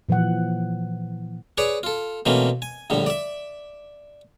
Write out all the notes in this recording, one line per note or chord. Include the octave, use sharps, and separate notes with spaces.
A#2 E3 F3 F#5
G#4 B4 C#5 D5
F4 A4
B2 E3 A3 A#3 C4 C#4
G#5
A#1 A2 D3 G3
D5 E5